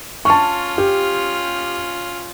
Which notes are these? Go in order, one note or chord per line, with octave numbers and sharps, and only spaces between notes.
C#4 F4 A5 C#6
G4